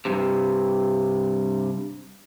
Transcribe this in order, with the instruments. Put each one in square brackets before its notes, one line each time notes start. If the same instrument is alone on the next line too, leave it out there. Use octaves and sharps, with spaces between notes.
[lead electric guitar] G2 C3